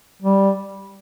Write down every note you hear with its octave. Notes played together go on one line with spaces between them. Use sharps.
G3